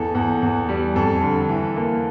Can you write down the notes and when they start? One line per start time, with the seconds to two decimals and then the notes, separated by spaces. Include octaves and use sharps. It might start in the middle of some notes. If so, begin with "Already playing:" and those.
Already playing: E2 A4
0.15 E2
0.42 E2
0.69 G3
0.95 F2 A4
1.22 D3
1.49 E3
1.76 A#3